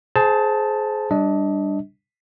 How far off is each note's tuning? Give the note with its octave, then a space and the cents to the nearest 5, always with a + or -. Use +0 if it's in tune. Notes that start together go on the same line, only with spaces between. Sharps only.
G#4 +25 C5 +0 A5 +0
G3 +0 D4 +0 D#5 +30